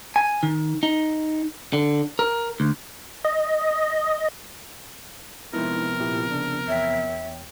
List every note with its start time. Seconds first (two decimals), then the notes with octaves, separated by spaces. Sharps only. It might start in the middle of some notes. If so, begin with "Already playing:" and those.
0.16 G#5
0.43 D#3
0.83 D#4
1.73 D3
2.19 A#4
2.60 D2
3.25 D#5
5.53 C3 F3 G#3 B3 D#4 E4 A#4
6.00 A#2 E4 G4
6.27 C#3 D4
6.68 E2 C#5 E5 G5